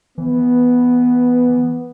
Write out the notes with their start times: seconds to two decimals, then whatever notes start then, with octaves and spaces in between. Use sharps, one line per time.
0.18 E3 B3